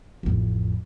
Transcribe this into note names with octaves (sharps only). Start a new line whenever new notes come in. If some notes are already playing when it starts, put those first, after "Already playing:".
A1 F2